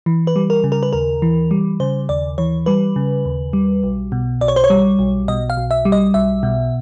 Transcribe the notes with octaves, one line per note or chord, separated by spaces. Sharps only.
E3
B4
G3
A#4
C#3
A#4
B4
D#2 A#4
E3
G3
C#3 C5
D#2 D5
E3 C#5
G3 B4
C#3
D#2
G3
B1
B2
B1 D5
C#5
C5
C#5
G3
B1
B2 D#5
F5
B1
E5
G3
D#5
B1 E5
B2